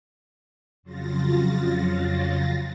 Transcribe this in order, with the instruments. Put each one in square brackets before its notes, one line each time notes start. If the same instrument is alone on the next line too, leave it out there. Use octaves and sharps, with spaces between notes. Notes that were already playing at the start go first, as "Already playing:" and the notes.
[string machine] F2 C#3 F#3 F4 A6 A#6